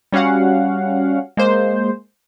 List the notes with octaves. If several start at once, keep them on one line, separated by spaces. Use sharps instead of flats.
G3 C#4 F#4 F5 F#5
G#3 A#3 C5